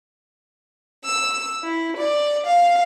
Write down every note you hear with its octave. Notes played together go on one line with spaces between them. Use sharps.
E6
E4
D5
F5